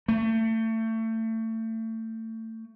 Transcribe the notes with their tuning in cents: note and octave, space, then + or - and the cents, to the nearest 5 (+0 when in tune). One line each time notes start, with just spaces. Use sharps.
A3 +30